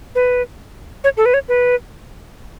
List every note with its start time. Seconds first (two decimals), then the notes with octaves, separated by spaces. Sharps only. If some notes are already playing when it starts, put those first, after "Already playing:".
0.15 B4
1.04 C#5
1.17 A4
1.25 B4
1.34 C#5
1.48 B4